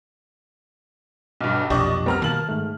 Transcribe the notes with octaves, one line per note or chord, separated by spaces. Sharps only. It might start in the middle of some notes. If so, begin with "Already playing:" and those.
B1 G2
B1 F2 A#2 D4 G4 D#5 C#6
G3 B3 C4 A#4 A#5 F6
B2 D#3 A#3 A5 F6 F#7
G#2 A3